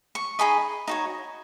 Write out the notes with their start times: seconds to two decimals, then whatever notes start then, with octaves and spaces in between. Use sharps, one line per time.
0.15 C#6
0.39 D#4 G#4 D#5 B5
0.87 D#4 F#4 C#5